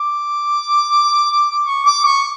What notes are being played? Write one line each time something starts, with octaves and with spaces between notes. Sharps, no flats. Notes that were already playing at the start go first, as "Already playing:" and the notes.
Already playing: D6
C#6
D6
C#6